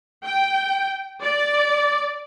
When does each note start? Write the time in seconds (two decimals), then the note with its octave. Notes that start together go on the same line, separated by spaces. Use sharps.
0.24 G5
1.22 D5